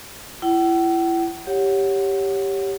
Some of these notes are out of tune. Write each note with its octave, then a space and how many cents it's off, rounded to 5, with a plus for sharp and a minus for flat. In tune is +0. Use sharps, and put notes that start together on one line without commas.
E4 +30 F#5 +45
G4 +0 C#5 +0 F#5 +0